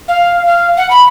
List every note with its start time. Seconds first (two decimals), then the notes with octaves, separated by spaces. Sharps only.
0.08 F5
0.46 F5
0.77 F#5
0.90 B5